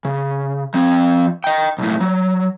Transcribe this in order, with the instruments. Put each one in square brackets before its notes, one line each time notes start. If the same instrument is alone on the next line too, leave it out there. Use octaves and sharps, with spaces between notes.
[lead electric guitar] C#3
F3 C4
D#5 G5
B1 A2
F#3